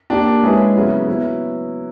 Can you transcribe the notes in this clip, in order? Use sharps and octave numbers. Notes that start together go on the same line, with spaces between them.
A#3 D4 G4
G#3 C#4 E4 G#4 B4
C#3 F#3 B3 E4
F#3 B3 E4